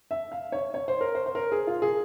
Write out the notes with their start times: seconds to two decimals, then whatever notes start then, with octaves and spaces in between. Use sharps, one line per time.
0.11 E5
0.32 F5
0.52 C#5
0.74 C#5
0.88 C5
1.01 A#4
1.15 C5
1.26 C5
1.35 A#4
1.52 G#4
1.67 F4
1.82 G#4